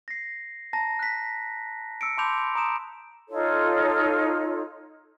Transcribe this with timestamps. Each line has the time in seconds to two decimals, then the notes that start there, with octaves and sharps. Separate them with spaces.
0.08 A#6 C7
0.73 A5 A#5 A#6
0.99 F#6 B6
2.01 E6 C#7 D7
2.18 A5 B5 C6 D6 G6 F7
2.55 A#5 C6 D#6 D7 E7
3.30 D#4 F4 A4 C#5